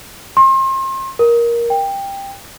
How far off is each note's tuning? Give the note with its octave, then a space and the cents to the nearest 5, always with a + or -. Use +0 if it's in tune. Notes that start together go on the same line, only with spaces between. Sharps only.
C6 +35
A#4 +10
G5 +15